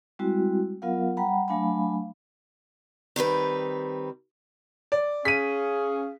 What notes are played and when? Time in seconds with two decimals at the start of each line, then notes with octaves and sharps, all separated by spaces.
0.19 G3 G#3 C4 E4 F#4
0.82 F#3 B3 F4 A#4 F5 F#5
1.17 G3 F#5 G5 A#5 B5
1.48 F#3 A3 D4 F5 G#5 B5
3.16 D#3 G3 C4 B4
4.92 D5
5.25 C#4 G#4 F5 B6 D#7